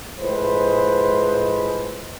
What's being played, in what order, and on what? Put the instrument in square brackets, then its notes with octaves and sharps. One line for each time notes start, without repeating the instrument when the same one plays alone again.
[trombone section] A2 F3 G#3 B4 C5